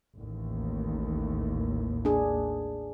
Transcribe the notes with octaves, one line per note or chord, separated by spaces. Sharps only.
A1 D#2
D4 G#4